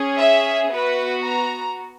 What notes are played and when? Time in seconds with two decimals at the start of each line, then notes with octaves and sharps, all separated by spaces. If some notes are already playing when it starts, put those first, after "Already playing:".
Already playing: C#4 G#4
0.16 E5
0.70 B3 F#4 B4
1.25 A#5